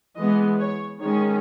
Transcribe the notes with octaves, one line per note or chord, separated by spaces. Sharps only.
E3 G#3 B3 D#5
C#5
D#3 G#3 C#4 C#5